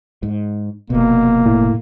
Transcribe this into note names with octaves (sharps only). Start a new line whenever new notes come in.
G#2
F1 B2 A#3
A2